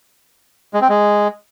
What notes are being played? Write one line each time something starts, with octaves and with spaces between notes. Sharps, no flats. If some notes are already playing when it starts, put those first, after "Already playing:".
G#3
C4
G#3